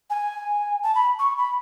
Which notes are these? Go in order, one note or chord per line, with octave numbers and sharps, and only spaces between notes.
G#5
A5
B5
C#6
B5